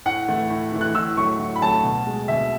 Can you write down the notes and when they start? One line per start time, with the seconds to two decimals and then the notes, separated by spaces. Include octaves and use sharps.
0.06 A2 F#5
0.28 E3 A3
0.50 A2
0.72 E3 A3
0.81 F#6
0.94 A2 E6
1.17 F#3 A3 C#6
1.39 A2
1.56 B5
1.62 F#3 A3 A5
1.84 B2
2.07 G#3
2.28 B2 E5